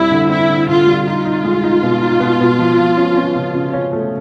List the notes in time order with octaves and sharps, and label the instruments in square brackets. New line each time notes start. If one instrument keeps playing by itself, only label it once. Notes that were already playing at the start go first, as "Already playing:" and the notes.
Already playing: [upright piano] F2 G3 C4 [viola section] E4
[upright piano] D3
[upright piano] C4 [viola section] E4
[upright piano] D3
[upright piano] D3 [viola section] F4
[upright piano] G3
[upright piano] D#4 [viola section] F4
[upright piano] D#4
G#3
D#4
B2
D#4
B2
B2
F3
F3
C#4
C#4
C#3
C#3
C#4
A3